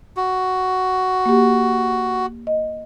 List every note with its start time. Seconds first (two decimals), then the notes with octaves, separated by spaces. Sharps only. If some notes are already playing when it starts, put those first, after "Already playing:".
0.17 F#4
1.26 A#3 G4
2.47 D#5